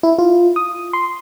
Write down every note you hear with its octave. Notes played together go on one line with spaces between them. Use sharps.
E4
F4
D#6
C6